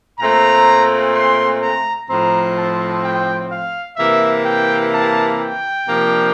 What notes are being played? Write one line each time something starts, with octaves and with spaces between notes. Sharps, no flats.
A#2 A3 C4 A#5
C6
A#5
A2 F3 C4 A#5
A5
G5
F5
C3 E3 A#3 E5
G5
A5
G5
C3 F3 A#3 D4